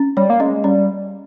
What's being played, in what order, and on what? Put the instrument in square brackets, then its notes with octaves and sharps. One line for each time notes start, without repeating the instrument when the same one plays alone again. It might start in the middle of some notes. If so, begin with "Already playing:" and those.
Already playing: [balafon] C#4
[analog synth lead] G3 [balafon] C#5
[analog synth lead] A#3
[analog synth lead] G#3 [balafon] C#4
[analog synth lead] G3 [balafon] C#4